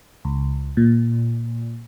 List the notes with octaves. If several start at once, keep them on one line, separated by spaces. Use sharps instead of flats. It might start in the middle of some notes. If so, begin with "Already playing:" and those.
C#2
A#2